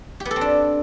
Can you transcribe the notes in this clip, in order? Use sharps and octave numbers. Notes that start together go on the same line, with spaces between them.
G4
B3
A4
C4
D4